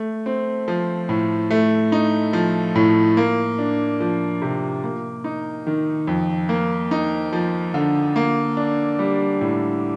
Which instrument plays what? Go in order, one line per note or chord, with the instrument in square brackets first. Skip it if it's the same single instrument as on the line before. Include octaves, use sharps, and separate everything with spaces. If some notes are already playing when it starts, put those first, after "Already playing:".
Already playing: [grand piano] A3
C4
F3
A2
A3
D#4
F3
A2
A#3
D4
F3
C3
A#3
D#4
D#3
F2
A#3
D#4
F3
D3
A#3
D4
G3
A2